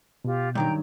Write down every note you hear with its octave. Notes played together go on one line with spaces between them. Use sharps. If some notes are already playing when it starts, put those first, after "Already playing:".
B2 F4 G4
G2 D#3 F#3 G5 A#5 G6